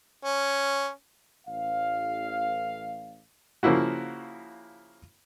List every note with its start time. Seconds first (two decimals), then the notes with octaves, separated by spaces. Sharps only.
0.24 C#4
1.47 A1 F5
3.63 C#3 F3 A#3 E4 F#4